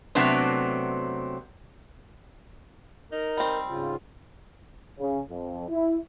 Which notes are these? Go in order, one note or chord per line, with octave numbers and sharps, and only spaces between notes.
C3 F#3 A3 B3 C4 D4
D#4 A#4
G3 C4
G#2 C#3 F4
C#3
F2
E4